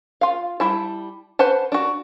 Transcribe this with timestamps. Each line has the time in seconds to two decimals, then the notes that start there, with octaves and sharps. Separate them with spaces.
0.21 F4 F5
0.60 G3 E4 A5
1.39 B4 C5 F#5 A5
1.72 D4 F#4